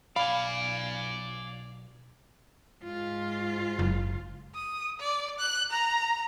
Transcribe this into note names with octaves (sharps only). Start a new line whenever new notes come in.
B1 D5 F5 G#5 B5
G#2 F4
F#1
D#6
D5
F#6
A#5